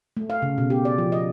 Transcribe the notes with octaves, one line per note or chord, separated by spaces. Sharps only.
A3
F5
C#3
B2
G4
D5
F3
D#5